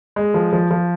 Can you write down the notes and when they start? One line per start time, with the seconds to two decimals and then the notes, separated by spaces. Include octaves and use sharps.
0.16 G#3
0.34 F3
0.53 F3
0.71 F3